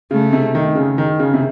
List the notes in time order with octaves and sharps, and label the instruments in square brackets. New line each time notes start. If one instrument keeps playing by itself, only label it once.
[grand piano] C#3 [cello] A3
[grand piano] C3
D#3
C#3
D#3
C#3
C3